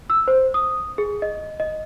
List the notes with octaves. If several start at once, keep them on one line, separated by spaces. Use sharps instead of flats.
E6
C5
D#6
G#4
D#5
D#5